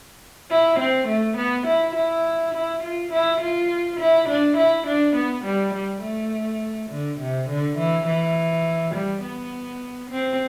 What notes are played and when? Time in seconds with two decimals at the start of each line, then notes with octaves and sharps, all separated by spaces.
0.51 E4
0.80 C4
1.08 A3
1.38 B3
1.67 E4
1.96 E4
2.54 E4
2.83 F4
3.13 E4
3.41 F4
4.00 E4
4.29 D4
4.58 E4
4.87 D4
5.16 B3
5.45 G3
5.74 G3
6.03 A3
6.90 D3
7.20 C3
7.49 D3
7.78 E3
8.07 E3
8.95 G3
9.23 B3
10.11 C4